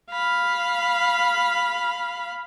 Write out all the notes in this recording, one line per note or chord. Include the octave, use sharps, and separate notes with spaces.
F5 B5